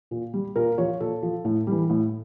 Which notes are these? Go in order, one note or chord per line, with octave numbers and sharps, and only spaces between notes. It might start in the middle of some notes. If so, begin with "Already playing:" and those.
A#2
G3
A#2 A#4
F3 C#5
A#2 A4
F3
A2
E3 G3
A2